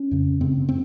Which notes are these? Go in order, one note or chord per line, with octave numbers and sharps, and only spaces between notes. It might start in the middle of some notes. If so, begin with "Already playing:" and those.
Already playing: C#4
F2 C#3
F#2 C#3 C4
C4